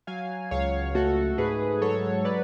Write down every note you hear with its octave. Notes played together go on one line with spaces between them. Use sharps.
F#3 F5 G#5
C#2 C#5 F5
A3 F#4 A4
G#2 G#4 B4
F#3 A4 C#5
B4 D5